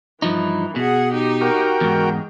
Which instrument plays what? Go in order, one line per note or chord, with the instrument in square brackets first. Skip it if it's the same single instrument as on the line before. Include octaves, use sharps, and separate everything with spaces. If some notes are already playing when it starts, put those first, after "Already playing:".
[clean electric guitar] G2 F3 D#4 [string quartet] E3
[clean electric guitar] B2 [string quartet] G#4 F#5
[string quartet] D#4 G4
[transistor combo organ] F#4 A#4 G5
[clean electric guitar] E2 G#2 [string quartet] G#3